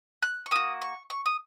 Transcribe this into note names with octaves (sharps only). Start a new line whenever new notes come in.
F#6
C#6
A#3 F#4 D#6
C#6
C#6
D#6